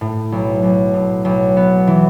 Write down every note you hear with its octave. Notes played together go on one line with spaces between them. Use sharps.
A2
B1
B1
A2
B1
B3
E3